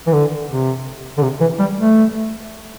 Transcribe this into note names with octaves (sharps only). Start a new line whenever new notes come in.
E3
D3
C3
D3
C3
E3
G3
A3